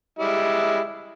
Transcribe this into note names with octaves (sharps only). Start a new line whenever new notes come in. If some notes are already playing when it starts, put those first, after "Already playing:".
G3 G#3 E4